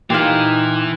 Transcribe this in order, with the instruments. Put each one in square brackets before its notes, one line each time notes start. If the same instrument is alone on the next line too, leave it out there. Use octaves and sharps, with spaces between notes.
[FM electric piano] A#2 C6 [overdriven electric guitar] E3 [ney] D#4 [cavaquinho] G4 F5